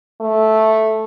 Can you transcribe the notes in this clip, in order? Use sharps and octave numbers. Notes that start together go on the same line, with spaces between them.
A3